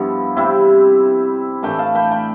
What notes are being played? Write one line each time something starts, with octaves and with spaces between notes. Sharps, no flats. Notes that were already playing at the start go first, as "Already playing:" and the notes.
Already playing: G2 F3 B3 E4
C3 G3 C4 E4
A2 E3 A3 D4 G5 B5
F5 A5
G5 B5
G5 B5